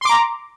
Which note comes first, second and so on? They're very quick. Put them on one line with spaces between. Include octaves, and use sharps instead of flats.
C6 D6 A#5